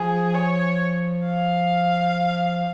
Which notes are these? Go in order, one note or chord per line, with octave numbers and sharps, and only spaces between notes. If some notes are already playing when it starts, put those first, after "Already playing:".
Already playing: F3 G#4
C#5
F5